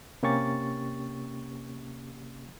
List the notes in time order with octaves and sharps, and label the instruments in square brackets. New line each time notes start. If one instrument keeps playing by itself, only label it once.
[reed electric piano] C3 A#3 C#4 G4 C#6 A6